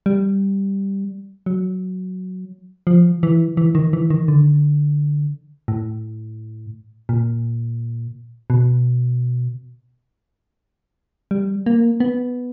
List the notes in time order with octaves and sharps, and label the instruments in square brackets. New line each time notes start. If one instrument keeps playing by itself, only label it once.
[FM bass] G3
F#3
F3
E3
E3
D#3
E3
D#3
D3
A2
A#2
B2
G3
A#3
B3